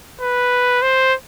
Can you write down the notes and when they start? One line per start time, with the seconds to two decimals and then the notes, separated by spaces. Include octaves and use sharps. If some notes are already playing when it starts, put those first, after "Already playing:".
0.21 B4
0.82 C5